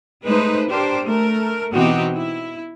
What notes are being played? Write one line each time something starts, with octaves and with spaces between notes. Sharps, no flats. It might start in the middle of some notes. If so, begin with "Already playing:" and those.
G#3 A3 D#4 B4 C5
D4 G4 A#4 C5
A3 A#4
B2 E3 C4 D#4 F#4 G4
E4